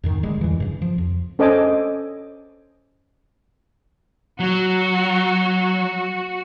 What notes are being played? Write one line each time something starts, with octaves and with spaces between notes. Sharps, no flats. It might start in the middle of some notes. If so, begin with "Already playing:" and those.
F2 G#2 D#3
D1 D3 G3 G#3
F2 E3
G2 C#3
F3
F2
C#4 A4 C5 D#5 G#5 D6
F#3 F#4